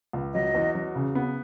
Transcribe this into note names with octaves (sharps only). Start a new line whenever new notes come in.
C#2
F#3 D#5
E2
F#3
C#3
B3